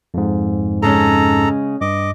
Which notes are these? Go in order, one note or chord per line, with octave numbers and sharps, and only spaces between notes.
F2 G#2
C#3 G#3 C#4 A4 A#5
G2 D#5 D6